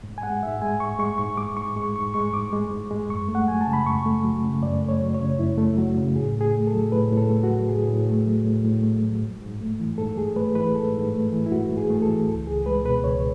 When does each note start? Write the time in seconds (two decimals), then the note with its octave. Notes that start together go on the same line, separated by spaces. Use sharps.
0.04 G#2
0.18 G#5
0.23 G#3 F#5
0.43 G#2 E5
0.62 G#3 G#5
0.80 G#2 C#6
0.99 G#3 C#6
1.18 G#2 C#6
1.37 G#3 D6
1.57 G#2 C#6
1.76 G#3 C#6
1.95 G#2 C#6
2.14 G#3 C#6
2.33 G#2 D6
2.53 G#3
2.71 G#2
2.91 G#3
3.09 F#2 C#6
3.28 A3
3.35 F#5
3.48 F#3 G#5
3.61 A5
3.67 C#3
3.73 B5
3.86 F#2 C#6
4.06 A3
4.25 F#3
4.44 C#3
4.63 F#2 D5
4.82 A3
4.89 C#5
5.01 F#3
5.14 C#5
5.21 C#3
5.39 F#2 E4
5.58 A3
5.77 F#3 F#4
5.97 C#3
6.16 A2 G#4
6.35 A2
6.41 G#4
6.54 A3
6.67 A4
6.73 F#3
6.92 A2 B4
7.12 A2
7.17 A4
7.30 A3
7.44 F#4
7.50 F#3
7.69 A2 G#4
7.88 A2
8.07 A3
8.26 F#3
8.45 A2
8.65 A2
8.83 A3
9.02 F#3
9.22 G#2
9.41 G#2
9.60 A3
9.80 E3
9.98 G#2 A4
10.17 G#2 G#4
10.36 A3 B4
10.55 E3 B4
10.75 G#2 A4
10.94 G#2
11.14 A3
11.32 E3
11.46 E4
11.51 G#2 F#4
11.70 G#2
11.77 G#4
11.90 A3
12.02 A4
12.08 E3
12.27 C#2 A4
12.46 C#2 G#4
12.66 G#3 B4
12.85 B2 B4
13.04 C#2 C#5